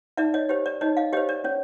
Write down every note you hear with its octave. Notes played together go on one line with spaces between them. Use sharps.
D#4 D5 E5
C#5 D#5
G4 C5 C#5
D5
D#4 C#5 D#5
D#5 F5
G4 C5 C#5 D#5
D5
C#4 C#5